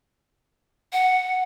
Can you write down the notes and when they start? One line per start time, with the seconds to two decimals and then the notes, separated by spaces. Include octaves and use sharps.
0.93 F#5